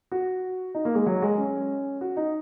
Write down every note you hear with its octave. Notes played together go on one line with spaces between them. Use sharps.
F#4
D#4
A#3
G#3
F#3
G#3
C#4
F#4
D#4